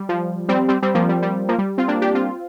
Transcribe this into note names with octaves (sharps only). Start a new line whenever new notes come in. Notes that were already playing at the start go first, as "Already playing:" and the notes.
Already playing: G3
F3
G3 C4
G3 C4
G3 C4
F3 A#3
G3
G3
F3 A#3
G3
C4 F4
A#3 D4
D4 G4
C4 F4